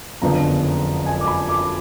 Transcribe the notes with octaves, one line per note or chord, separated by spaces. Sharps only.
F#1 F2 D3 F3 B3 A#5
G#5
D6
B5
D6